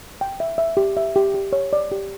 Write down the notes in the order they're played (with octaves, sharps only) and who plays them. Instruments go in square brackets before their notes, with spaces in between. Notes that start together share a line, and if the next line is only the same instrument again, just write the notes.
[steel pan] G5
E5
E5
G4
E5
G4
G4
C#5
D5
G4